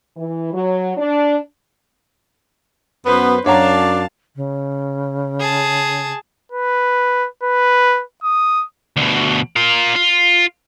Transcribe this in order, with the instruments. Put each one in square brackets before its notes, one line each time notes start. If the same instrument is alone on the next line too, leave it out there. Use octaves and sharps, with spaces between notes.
[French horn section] E3
F#3
D4
[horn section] F#2 B3 [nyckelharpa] B4 C5
[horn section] F#2 D4 [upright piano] C#5 F#5 A#5 [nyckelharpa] F5 A5
[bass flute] C#3
[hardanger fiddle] G#4 A5
[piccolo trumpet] B4
B4
D#6
[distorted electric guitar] D2 B2
F4 A#4
F4